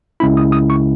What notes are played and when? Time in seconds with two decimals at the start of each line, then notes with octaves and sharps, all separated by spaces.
0.20 C#2 C#3 G#3 C#4 E4 B5
0.37 D#6
0.52 D#6
0.70 C#6